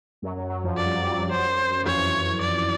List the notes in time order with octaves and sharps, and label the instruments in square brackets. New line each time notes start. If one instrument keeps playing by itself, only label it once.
[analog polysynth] F#2 F#3
F#2 F#3
F#2 F#3
F2 F3
[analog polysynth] F#3 [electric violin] D5
[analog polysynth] G3
F#3
G3
F#3
G3
[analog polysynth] F#2 F#3 [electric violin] C5
[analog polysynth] E3
[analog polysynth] F2 F3 [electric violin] C#5
[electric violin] D5